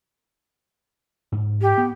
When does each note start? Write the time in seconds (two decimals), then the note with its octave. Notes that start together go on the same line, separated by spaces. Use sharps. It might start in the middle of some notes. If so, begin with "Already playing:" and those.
1.32 G#2
1.61 G4
1.78 B3